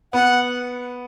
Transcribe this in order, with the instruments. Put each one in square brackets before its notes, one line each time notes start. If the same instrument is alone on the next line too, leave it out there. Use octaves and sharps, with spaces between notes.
[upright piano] B3 [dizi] F#5